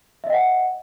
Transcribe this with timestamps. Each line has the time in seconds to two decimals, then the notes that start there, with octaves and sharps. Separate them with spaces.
0.24 E5
0.27 D#5
0.30 G5
0.33 F#5